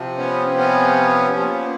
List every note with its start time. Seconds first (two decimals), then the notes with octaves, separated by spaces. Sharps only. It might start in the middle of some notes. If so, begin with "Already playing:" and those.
Already playing: C3 F3
0.18 B3 C#4
0.57 B3 C#4
1.35 A#2 F3